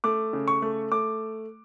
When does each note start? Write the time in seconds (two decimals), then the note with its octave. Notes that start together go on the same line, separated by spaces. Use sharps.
0.04 A3 D6
0.33 C#3
0.48 C#6
0.62 A3
0.92 A3 D6